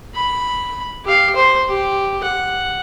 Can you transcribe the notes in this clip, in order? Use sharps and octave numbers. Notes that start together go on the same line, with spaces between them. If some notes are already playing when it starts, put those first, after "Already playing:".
B5
G4 F5
C5
G4
F#5